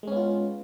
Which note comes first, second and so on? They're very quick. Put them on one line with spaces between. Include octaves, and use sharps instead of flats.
G#3 C#4 B3 F4